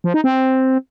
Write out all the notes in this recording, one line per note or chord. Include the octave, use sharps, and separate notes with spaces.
F3
D#4
C4